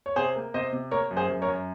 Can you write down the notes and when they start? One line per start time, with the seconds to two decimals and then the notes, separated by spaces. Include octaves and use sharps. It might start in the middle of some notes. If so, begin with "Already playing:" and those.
0.06 C#5
0.16 C3 G#4 C5
0.35 A#3
0.54 C3 C5 D#5
0.73 C3
0.91 A#3 A#4 C#5
1.11 F#2
1.17 G#4 C5
1.29 F#2
1.42 A#4 C#5
1.48 F#2